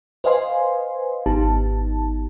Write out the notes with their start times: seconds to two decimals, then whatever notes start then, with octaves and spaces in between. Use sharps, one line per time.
0.24 B4 C5 D#5 F5 G#5 C6
1.26 G#1 B3 D#4 G4 A5